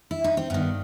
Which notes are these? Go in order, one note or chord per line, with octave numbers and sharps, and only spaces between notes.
E4
D#4
C4
G2 D#3 B3